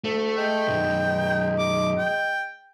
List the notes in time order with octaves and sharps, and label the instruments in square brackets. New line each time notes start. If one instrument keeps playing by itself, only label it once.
[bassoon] D2 [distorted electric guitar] A3
[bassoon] G#3 [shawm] G5
[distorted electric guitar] B1 F#2
[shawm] D6
G5